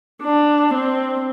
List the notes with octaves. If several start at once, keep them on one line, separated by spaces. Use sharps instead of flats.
D4
C4